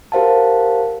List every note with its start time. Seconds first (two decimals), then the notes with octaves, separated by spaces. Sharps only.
0.12 G4 A#4 C5 F5 F#5 A5